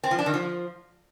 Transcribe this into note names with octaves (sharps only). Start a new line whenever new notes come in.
C4
F3
D4
D#3
F3